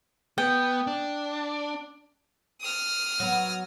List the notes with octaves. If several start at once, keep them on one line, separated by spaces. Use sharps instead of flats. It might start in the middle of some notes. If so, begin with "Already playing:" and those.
B3 G5
D4
D#6 F6
F#3 B3